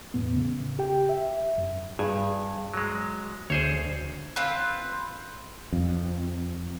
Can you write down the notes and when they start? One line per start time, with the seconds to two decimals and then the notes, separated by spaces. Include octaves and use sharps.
0.14 E2 A2 B3
0.36 C#3
0.79 G4 G5
1.09 E5
1.58 F#2
1.99 G2 G#4
2.74 F#3 G#3
3.50 D2 G#4 C5 C#5
4.36 C4 F4 B4
5.73 F2